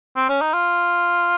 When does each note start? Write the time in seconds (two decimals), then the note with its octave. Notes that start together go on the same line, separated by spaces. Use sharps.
0.16 C4
0.29 C#4
0.41 D#4
0.54 F4